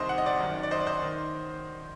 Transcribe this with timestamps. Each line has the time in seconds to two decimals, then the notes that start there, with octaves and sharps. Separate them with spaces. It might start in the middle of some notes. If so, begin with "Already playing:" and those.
Already playing: C2 C3 D#3 C5 D#5
0.09 F#5
0.18 D#5
0.26 D5 F#5
0.40 F#2 D#3
0.63 D5
0.71 C5 D#5
0.80 D5
0.86 C5 D#5
1.02 D#3